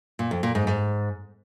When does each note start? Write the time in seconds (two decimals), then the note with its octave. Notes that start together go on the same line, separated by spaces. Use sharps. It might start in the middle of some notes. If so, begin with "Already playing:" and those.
0.19 A#2
0.31 F2
0.43 A#2
0.55 G#2
0.67 G#2